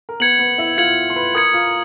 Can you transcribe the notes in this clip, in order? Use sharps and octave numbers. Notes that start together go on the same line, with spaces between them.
A#4
B3 B4 G#6 C#7 F#7
B3 B4
E4 E5
F4 F5 G#6 C#7 F#7
C6
B4 B5
A#4 A#5 D#6 G#6 C#7
F4 F5